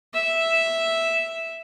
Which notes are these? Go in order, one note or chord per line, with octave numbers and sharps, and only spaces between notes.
E5